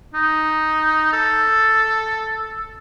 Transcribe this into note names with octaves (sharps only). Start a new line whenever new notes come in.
D#4
A4